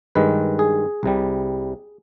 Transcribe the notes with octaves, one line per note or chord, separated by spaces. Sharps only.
G2 D#3 G#3 B4
G#4
C2 C3 G3